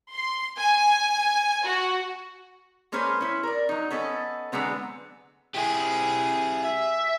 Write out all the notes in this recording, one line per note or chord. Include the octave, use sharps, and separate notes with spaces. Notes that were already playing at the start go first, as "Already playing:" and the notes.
C6
G#5
F#4
G#3 A#3 C#4 B4 C5
C#4 E4
A#4 D5
F#3 D#4
B3 C#4 A4 D#5
D3 F#3 G#3 B3 C4
E4 G4 G#4
E5